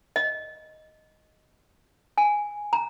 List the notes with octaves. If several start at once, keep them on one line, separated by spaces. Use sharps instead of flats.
D#5
G#5
A#5